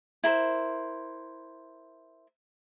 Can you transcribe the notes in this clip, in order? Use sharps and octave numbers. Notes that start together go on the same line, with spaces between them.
E4 A#4 C5